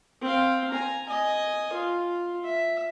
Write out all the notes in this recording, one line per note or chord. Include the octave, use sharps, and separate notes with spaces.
C4 F5
G#5 A#5
D#5 G#5
F4
E5